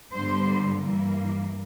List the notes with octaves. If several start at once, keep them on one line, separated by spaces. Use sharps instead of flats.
G2 D3 G3 B3 C5
G2 E3 G3 A#3